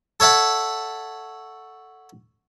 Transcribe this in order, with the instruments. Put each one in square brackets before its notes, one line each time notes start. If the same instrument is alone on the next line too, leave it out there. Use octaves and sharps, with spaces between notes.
[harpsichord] A4 C#5 E5 F#5 A5